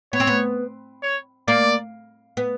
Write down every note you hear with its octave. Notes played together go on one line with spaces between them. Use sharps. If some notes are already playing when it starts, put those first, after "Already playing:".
B3 C#5
C4
B3
C#5
A#3 D5
B3